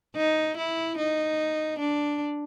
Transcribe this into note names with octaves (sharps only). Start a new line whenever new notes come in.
D#4
E4
D#4
D4